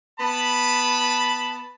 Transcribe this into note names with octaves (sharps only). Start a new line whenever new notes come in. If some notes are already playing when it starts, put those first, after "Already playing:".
B3 A5 B5